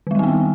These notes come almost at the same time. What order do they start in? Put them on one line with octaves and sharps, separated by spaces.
D#3 G#3 G3 C4 B3